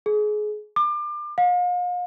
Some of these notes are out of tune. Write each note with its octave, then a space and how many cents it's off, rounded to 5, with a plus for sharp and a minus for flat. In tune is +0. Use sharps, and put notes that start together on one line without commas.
G#4 +25
D6 +30
F5 +40